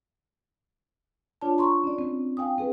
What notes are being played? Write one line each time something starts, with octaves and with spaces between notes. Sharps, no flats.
D4 F4 C#5 D5 A5
A#5 C6 C#6
C#4 D5
C4
F5 G5 G#5 D#6
C4 G#4 B4